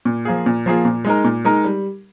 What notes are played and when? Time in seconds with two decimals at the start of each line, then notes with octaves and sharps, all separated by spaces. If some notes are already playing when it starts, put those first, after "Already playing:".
0.05 A#2
0.25 F3 A#3 F4 G#4
0.46 A#2
0.66 F3 A#3 F4 G#4
0.85 A#2
1.05 G#3 D#4 A#4
1.24 A#2
1.45 G#3 D#4 A#4
1.64 G3